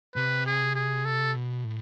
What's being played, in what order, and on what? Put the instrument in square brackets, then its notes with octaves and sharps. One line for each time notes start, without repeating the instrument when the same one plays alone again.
[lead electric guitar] C3 [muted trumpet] B4
[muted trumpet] G#4
G#4
A4
[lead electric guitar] B2
A2